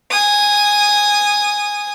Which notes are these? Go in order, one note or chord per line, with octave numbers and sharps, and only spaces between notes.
G#5 D#6